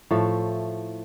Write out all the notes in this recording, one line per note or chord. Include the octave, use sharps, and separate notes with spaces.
A2 F3 A3